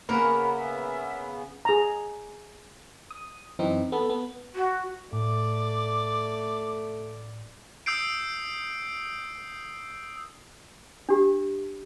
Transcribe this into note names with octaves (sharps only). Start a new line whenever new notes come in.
C#3 A#3 B3 C#4 F#4 A#4 B5
E5
G#4 A#5
D#6
F#2 E3 C4 D#4
B3 A4
B3
F#4
A2 A3 D5 D6
D#6 E6 G6 C7 D7
D4 G4